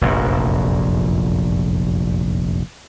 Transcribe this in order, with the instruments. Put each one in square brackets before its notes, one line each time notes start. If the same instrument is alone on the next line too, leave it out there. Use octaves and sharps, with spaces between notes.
[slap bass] F1 A#1 F#2